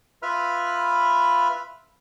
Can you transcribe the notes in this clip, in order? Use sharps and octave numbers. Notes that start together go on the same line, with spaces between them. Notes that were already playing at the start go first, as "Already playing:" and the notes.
F4 B4 E5 B5 F6